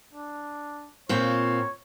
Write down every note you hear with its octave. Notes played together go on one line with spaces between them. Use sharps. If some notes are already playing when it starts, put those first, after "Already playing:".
D4
A#2 C4 F4 C#5